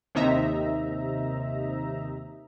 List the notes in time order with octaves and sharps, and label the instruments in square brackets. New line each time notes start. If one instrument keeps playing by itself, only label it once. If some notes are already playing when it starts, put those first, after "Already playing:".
[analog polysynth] D#2 C3 D#4 E5 A#5